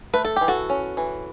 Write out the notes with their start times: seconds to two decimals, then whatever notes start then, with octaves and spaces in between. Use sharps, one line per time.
0.13 A3 B4
0.25 A4
0.36 E3 G4
0.48 F#4 A4
0.70 C#4
0.97 E3